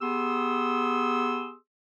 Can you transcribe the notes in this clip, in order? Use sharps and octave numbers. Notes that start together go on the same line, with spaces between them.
B3 G4 G#4 C6 D#6 E6